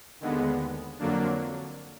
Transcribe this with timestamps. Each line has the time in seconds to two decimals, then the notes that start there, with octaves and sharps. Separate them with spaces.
0.20 D#2 D3 G#3 B3
0.99 F2 D3 F#3 A#3 D4